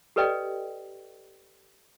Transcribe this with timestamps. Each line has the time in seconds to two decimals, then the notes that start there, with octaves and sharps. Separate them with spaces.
0.16 G4 A4 B4 D5 D#5 G5